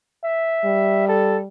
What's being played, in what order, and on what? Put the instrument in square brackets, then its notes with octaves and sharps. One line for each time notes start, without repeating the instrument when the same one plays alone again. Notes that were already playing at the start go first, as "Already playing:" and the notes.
[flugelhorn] E5
[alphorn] G3
[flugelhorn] A4